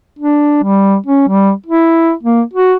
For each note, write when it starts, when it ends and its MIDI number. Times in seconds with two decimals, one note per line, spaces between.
0.19 0.59 62
0.63 0.96 55
1.06 1.25 61
1.28 1.52 55
1.66 2.12 64
2.23 2.42 58
2.53 2.75 66